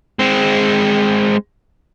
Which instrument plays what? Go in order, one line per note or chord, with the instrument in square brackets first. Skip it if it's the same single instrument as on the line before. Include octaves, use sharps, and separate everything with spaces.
[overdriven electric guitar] G#3 C4